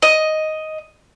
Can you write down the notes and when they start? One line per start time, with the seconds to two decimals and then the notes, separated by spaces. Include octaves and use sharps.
0.02 D#5